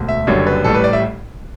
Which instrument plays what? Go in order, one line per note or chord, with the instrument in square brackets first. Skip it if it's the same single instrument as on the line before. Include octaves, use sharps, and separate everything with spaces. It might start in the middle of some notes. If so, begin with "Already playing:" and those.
Already playing: [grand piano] E1 D2
E5
F#1 F#2 D3 G3 C#5
B4
A1 A2 G3 A4
B4
D5
E5